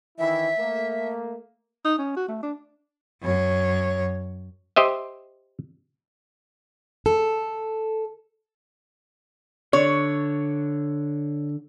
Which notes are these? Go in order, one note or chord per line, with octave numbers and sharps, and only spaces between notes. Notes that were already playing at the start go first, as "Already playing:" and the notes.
D#3 E3 E4 E5
A3 A#3
D#4
C#4
F#4
A3
D4
F#2 C#5
G4 C5 D#5 E5
A4
D3 C#5